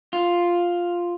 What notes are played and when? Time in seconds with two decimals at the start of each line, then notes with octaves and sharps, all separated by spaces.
0.13 F4